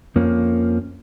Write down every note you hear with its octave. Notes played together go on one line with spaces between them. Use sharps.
F2 F3 A#3 C#4